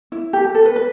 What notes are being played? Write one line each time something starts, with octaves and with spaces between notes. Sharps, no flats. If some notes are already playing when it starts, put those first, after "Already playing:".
E4
G4
G4
A4
B4
B4